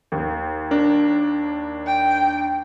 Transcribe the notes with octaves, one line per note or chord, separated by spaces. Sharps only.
D#2
D4 A#4
G5